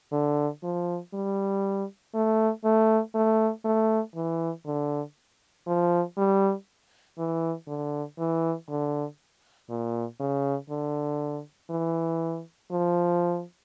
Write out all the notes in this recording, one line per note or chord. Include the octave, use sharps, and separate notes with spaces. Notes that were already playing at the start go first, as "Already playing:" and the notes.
D3
F3
G3
A3
A3
A3
A3
E3
D3
F3
G3
E3
D3
E3
D3
A#2
C#3
D3
E3
F3